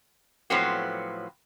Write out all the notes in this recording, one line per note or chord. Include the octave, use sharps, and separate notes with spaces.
A2 F3 F#3 B3 C4 F#4